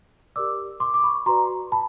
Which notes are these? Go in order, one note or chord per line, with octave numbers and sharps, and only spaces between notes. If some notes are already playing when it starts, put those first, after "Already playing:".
G4 A#4 D5 D6 E6
C6 D6
D6
B5 C#6
F#4 B4 D5 A#5 C6
A5 B5